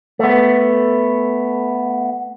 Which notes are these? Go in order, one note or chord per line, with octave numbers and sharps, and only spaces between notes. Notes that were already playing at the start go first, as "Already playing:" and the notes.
A3 B3